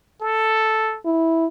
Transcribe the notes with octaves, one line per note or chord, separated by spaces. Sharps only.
A4
E4